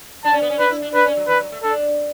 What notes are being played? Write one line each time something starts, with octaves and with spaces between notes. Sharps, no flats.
D4 A5
C#4
B3
C#4
D4 B4
E4
D4
D4 B4
C#4
F#3
E3 B4
F#3
A3
D4 A4